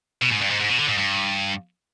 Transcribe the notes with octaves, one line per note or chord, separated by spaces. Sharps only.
B2
G#2
G2
G#2
G#2
B2
D3
G#2
G2